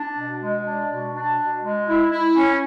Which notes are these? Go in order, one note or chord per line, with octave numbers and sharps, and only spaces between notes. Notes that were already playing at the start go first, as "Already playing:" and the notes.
Already playing: D4
B2
G#3
D4
B2
D4
B2
G#3
E4
E4
C#4